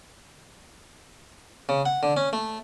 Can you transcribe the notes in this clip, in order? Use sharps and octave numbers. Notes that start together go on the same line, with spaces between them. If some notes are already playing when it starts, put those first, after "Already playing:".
C#3
F#5
D3
C#4
A3